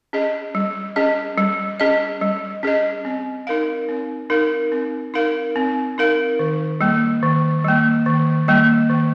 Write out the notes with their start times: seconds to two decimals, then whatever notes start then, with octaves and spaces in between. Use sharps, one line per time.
0.13 C#4 G#4 D#5
0.55 G3
0.96 C#4 G#4 D#5
1.38 G3
1.80 C#4 G#4 D#5
2.21 G3
2.63 C#4 G#4 D#5
3.05 C4
3.47 D#4 A#4 F5
3.89 C4
4.30 D#4 A#4 F5
4.72 C4
5.14 D#4 A#4 F5
5.56 C4
5.98 D#4 A#4 F5
6.39 D#3
6.81 G3 A#3
7.23 D#3
7.64 G3 A#3
8.06 D#3
8.48 G3 A#3
8.90 D#3